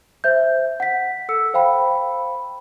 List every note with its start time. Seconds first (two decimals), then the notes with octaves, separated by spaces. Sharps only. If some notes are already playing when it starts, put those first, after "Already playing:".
0.24 C5 E5 G6
0.80 F#5 B6
1.29 A4 E6 C#7
1.54 C5 F5 G5 B5